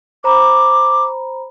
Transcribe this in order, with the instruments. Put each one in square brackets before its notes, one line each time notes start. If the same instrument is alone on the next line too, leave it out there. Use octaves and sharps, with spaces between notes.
[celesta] C5 A#5 B5 [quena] D6